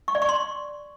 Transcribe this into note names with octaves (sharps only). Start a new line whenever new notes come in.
C#6
D5
C#6
C6